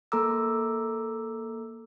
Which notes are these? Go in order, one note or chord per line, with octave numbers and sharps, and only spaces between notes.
A#3 A4 A#5 D6 E6